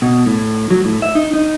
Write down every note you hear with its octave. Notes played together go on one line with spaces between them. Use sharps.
B2
A2
F#3
A2
E5
D#4
D#4